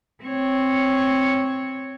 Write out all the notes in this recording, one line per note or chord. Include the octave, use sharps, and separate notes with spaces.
C4 C#5